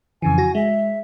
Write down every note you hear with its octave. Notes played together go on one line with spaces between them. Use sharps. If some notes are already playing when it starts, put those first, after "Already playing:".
F2 C#3 E3 G#5
F#4 A#6
G#3 E5